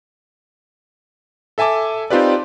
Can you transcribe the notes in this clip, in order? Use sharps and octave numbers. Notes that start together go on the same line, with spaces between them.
A4 E5 G#5 A5 D6
C4 D#4 F4 G4 B4 D5